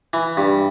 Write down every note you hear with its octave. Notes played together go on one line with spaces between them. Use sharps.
E3
G2